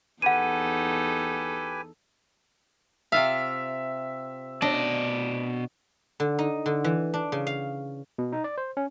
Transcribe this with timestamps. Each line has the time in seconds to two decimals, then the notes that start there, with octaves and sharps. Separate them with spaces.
0.22 E2 D#4 G4 A4 B4 F#5 G#5 D#7
3.12 C3 F4 E5 F5
4.62 B2 D4 D5 D#5
6.20 D3
6.39 D#4
6.66 D3
6.84 E3
7.14 D4
7.32 C#3
7.47 F5
8.18 B2
8.32 D#4
8.44 D5
8.58 C5
8.77 C#4